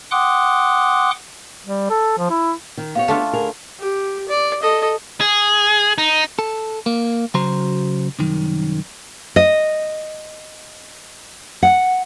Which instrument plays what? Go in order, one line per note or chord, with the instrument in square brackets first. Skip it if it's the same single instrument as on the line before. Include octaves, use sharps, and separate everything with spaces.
[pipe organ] F#5 G5 C6 D6 D#6 F#6
[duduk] G3
A4
F3
E4
[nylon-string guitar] D#3
[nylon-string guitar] B3 G4 C#5 [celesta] F5
[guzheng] A3 D4 F4
[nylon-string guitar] D2 G#4 A#4
[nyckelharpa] G4
D5
A4 D#5
[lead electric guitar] G#4
D#4
[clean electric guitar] A4
A#3
C#3 F#3 F#4 C5 A#5 C6
C2 F#2 D#3
[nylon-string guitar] D#5
F#5